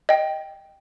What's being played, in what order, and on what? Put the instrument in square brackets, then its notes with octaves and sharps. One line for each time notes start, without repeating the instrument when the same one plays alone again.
[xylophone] D#5 G5